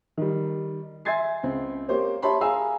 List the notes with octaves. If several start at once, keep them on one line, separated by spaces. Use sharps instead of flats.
D#3 G3
E5 G#5 C6 G#6 A6 C7
C#2 C4
A#3 G4 C5 C#5
G4 C#5 E5 A5 B5 C6
G#4 F5 G#5 A#5 E6